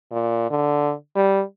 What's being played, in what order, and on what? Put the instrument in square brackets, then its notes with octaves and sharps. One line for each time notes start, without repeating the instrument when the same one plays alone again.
[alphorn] A#2
D3
G3